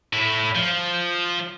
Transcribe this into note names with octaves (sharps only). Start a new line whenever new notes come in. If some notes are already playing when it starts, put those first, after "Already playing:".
A2 E4
F3